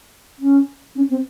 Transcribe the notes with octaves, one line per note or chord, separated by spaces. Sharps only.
C#4
C#4
C4